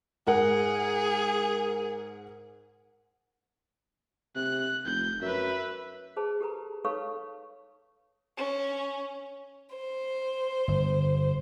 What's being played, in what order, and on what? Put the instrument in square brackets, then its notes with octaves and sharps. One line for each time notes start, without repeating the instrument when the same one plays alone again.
[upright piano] G#2 A#4 F#5 [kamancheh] G#4
[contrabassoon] C3 [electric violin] F#6
[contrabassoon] F1 [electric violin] G6
[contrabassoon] F#2 [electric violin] B4 E5
[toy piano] G#4 B4 C5 A5
G4 A4 B4 A#5
D#4 A4 B4 C#5 F5 C#6
[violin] C#4
[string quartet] C5
[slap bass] G1